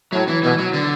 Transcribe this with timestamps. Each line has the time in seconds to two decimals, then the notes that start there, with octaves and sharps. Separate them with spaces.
0.13 A2 F#3
0.28 E3
0.43 B2 E3
0.58 F#3
0.73 D3